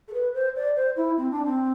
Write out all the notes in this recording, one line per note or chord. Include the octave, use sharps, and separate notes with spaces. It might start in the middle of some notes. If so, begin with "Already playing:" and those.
A4
B4
C5
D5
C5
E4
C4
D4
C4